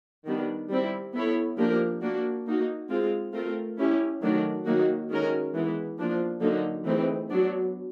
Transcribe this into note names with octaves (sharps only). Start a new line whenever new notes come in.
D#3 G3 B3 D4
G3 C4 E4
B3 E4 A4 C#5
F3 A#3 D4 G4 A#4
A#3 D4 F#4
A#3 D#4 F#4
G#3 C4 F4 G#4
A3 C4 F4 A#4
C#4 E4 G4
D#3 F#3 A3 D4 F#4
D#3 F#3 A#3 D#4 F#4
D#3 G#3 C#4 F#4 A#4
E3 G#3 B3
F3 A#3 D4 F4
D3 F#3 A#3 D#4
E3 A3 C4 D#4 G#4
F#3 B3 D4